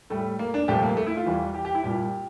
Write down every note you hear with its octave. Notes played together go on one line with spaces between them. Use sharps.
A2 G3 A3
A#3
D4
C2 A#2 F3 A3 G4
A#3
A3
E4
F4
E2 E3 G3
G4
G4
E4
C2 A#2 G3 G4